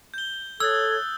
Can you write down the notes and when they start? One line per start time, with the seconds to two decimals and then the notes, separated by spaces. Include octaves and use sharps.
0.14 G6 G7
0.60 A4 C#5 D#6 E6 F#6 G#6 A6